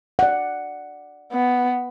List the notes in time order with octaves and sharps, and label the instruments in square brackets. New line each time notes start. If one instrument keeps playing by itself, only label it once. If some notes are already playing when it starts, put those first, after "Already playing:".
[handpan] D5 F#5
[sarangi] B3